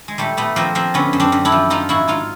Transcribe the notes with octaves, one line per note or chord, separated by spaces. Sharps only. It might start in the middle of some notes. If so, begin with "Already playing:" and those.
G#3
A#2 G3 A3
A#2 A3 B3
F3 A#3 C4
F3 A#3 C4
D3 B3 C#4
F#2
C4 D4
F#2
D4 E4
F3
F3 D#4 F4
G#2 E4 F#4
G#2 D#4 F4